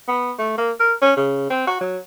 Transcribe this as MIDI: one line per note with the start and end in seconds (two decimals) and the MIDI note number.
0.08 0.32 59
0.39 0.57 57
0.58 0.71 58
0.79 0.93 70
1.01 1.14 61
1.17 1.45 49
1.50 1.67 60
1.67 1.80 66
1.81 1.98 54